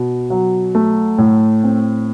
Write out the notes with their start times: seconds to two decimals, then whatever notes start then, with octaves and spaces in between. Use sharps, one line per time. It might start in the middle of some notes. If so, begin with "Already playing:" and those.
Already playing: B2
0.30 F#3
0.75 A3
1.18 A2
1.64 C4